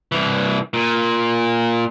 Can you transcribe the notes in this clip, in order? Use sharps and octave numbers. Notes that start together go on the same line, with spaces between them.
C2 E3
A#2